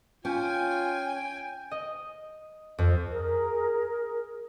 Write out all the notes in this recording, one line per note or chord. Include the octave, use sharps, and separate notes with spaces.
C#4 F4 G5 G#5
D#5
F2
G#4 A#4